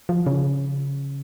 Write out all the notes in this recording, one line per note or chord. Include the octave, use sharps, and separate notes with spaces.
F3
C#3